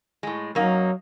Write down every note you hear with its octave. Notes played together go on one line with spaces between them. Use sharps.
A2 G#3
F#2 F#3 A#3 D#4